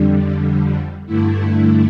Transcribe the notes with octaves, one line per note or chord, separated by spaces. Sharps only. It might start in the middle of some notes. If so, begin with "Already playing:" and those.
Already playing: F2 D3 G3
G2 D3 A3 E4